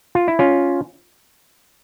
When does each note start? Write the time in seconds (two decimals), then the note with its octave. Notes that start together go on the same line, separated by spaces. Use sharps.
0.15 F4
0.28 E4
0.39 C#4 F4